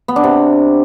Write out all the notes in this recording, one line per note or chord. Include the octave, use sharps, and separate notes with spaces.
B3
D4
C3